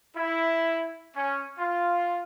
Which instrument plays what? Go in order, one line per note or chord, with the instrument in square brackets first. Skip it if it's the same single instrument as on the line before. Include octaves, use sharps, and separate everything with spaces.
[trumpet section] E4
C#4
F4